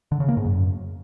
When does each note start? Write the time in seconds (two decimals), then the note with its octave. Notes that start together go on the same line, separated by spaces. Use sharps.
0.12 D3
0.20 C#3
0.28 A#3
0.37 G#2
0.45 F#2